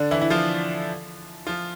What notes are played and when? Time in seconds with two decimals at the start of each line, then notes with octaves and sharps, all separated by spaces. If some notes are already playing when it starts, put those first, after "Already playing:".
Already playing: D3 D4
0.11 E3 E4
0.21 E4
0.30 F3 F4
1.47 F3 F4